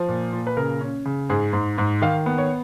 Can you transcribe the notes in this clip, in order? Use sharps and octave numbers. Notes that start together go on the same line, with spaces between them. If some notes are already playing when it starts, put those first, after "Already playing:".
Already playing: F3
A#2
A#2
B4
C#3 A#4
C#4
C#3
G#2 G#4
G#2
G#2
D#3 F5
B3
C#5